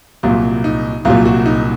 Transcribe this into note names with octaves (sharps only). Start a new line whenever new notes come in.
C2 A#2 F#3 F4
D#4
C2 A#2 F#3 F4
F#4
D#4